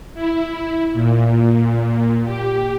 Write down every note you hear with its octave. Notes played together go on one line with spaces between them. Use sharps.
E4
A#2
G4